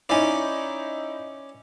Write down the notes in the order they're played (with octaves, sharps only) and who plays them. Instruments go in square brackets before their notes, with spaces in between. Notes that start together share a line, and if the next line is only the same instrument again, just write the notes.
[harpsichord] C#4 D5 [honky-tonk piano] D#4 E4